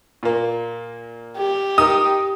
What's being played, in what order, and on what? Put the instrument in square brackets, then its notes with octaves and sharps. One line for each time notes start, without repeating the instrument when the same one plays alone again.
[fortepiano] A#2 A#3
[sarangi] G4
[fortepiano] D#4 A#4 [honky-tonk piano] D#6